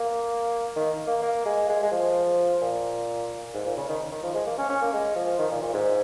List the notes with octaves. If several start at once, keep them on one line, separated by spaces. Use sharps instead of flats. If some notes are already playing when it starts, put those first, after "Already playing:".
Already playing: A#3
D#3
A#3
A#3
G#3
G#3
G#3
F3
A#2
G#2
A#2
C#3
D#3
D#3
F3
G#3
A#3
C#4
C#4
A#3
G#3
F3
D#3
A#2
A#2
G#2